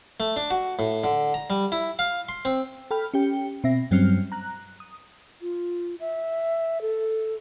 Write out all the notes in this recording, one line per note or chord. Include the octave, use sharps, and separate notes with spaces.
A3
D4
F#4
A2
D3
A#5
G3
E4
F5
C6
C4
A4 G5 B5 F6
C#4 G4 G5
B2 C4 E5 A#6
G2 F#3 G3 C4 C#4 F6
A#5 F#6
D#6
F4
E5
A4